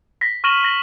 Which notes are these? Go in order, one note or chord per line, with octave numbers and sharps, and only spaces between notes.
A#6 B6
C#6 F6 A#6 D#7 E7 F#7
C#6 A#6 F#7